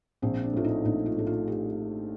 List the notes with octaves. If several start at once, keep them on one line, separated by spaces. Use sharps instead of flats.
A#1 C4
D4
A2 A3 F4
D#4
A#1 D#4
F4
A2 A3
F4
G4